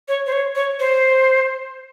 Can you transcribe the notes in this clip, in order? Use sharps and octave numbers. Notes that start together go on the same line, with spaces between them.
C#5
C5
C#5
C#5
C5